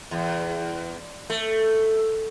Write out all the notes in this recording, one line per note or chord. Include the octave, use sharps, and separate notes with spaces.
E2
A3